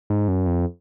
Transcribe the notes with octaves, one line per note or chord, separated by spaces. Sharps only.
G#2
F#2
F2